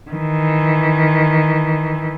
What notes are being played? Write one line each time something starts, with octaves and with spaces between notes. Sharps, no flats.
D#3 E3